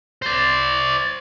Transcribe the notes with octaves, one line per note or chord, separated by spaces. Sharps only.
C5 D5